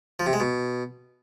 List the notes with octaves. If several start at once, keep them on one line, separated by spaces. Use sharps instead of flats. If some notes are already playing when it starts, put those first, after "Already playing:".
F3
C3
G#3
B2